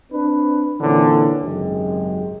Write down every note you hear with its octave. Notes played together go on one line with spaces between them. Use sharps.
C4 D4 B4
A#2 D3 E3 C4 C#4
G#1 F#2 C#3 F#3 G#3 G4